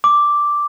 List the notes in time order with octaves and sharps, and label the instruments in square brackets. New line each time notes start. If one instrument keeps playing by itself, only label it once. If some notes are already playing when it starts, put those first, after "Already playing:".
[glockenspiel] D6